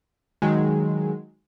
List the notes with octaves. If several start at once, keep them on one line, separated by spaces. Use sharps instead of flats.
D#3 F#3 G#3